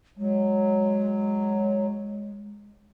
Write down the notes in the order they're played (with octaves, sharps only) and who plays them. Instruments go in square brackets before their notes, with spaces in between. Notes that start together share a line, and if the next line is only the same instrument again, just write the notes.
[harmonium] F#3 [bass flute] G#3